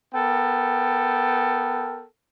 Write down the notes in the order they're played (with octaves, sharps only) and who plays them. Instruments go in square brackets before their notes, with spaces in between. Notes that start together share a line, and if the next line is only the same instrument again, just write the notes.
[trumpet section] B3 A4 A#4 G5